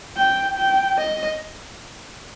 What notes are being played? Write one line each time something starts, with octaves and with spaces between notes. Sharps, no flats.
G5
G5
D#5